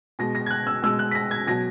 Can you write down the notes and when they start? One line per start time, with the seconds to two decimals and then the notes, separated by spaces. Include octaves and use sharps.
0.19 B2 G#3 A#6
0.35 A#6
0.46 G#6
0.51 F#6
0.67 E6
0.83 B2 G#3 E6
0.99 F#6
1.11 B6
1.15 A#6
1.31 G#6
1.47 B2 F#3 A#6